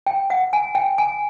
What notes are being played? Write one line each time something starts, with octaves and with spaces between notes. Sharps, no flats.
G5
F#5
G#5
G5
G#5